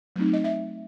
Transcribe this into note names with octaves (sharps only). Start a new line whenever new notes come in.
F#3 A3 C4 D#4
D#5
E5